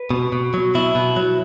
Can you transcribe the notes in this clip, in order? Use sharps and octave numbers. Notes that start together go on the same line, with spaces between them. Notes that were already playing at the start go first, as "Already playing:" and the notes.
Already playing: B4
B2
B2
F#3
B2 E4
B2
F#3